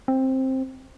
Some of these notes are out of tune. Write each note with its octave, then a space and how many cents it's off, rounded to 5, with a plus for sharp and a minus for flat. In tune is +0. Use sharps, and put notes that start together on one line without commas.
C4 +10